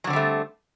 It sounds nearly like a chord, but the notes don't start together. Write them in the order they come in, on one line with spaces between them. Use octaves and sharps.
F#3 D3 C4 G3 A3